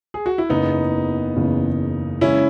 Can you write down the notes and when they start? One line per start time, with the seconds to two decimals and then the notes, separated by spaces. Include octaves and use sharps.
0.14 G#4
0.26 F#4
0.38 E4
0.49 F#1 E2 C#3 E3 B3 D#4
1.36 F#1 E2 C#3 E3
2.21 C#3 E3 G#3 C#4 E4